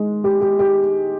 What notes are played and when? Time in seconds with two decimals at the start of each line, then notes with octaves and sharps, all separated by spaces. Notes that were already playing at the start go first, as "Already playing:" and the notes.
Already playing: D#3 G#3
0.24 G4
0.41 G4
0.59 G4